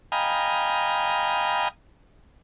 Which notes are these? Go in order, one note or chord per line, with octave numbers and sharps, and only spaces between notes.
D#5 F5 G5 G#5 A#5 B5